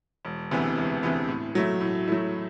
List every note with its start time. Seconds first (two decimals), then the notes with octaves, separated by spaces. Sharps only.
0.25 E1
0.51 D2 C3 E3 B3
0.77 E1
1.03 D2 C3 E3 B3
1.28 A2
1.55 F#3 A3 E4
1.81 A2
2.08 F#3 A3 E4